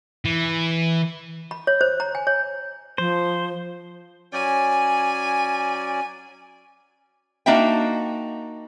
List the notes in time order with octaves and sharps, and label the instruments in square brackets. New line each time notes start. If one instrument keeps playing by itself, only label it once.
[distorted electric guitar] E3
[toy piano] B5
C#5
C5
A#5
G#5
C#5
[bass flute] F3 [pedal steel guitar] C5
[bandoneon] F#3 C#4 D5 [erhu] G#5
[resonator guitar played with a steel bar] A#3 D4 D#4 F#4 E5 G5